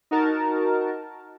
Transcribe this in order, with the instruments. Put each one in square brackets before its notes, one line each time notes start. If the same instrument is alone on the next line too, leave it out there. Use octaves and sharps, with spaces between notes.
[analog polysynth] D#4 F#4 A#4 A5